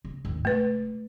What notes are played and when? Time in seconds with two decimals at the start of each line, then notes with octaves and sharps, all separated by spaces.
0.05 C#3
0.25 G#1 D#2
0.45 F1 G#3 A3 B4